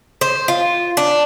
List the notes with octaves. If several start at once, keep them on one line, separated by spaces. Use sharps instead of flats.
C5
F4
D4